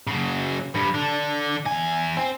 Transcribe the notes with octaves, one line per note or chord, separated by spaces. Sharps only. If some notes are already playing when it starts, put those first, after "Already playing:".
C#3 F#3
G2 B3
D3 D4
E2 G#5
C4